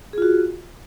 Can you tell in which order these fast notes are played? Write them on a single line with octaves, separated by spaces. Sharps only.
G#4 F4 F#4